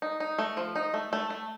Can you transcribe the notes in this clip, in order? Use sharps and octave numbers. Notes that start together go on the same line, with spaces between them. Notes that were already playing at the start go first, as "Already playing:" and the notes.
D#4
D#4
A3
F3
D#4
A3
A3
A3